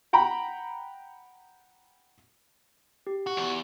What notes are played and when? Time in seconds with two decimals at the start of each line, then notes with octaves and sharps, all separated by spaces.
0.13 F#5 G5 A#5 B5
3.07 G4
3.27 F#4
3.38 E2